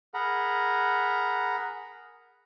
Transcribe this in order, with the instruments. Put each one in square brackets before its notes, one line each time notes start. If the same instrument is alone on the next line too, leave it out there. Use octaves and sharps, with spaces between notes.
[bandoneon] G#4 A#4 F#5 A#5 B5